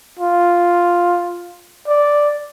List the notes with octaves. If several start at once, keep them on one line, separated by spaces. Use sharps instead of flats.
F4
D5